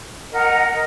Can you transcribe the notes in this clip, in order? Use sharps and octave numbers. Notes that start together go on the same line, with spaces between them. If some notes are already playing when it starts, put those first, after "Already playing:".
A#4 D#5 F#5 A#5
A#4 D#5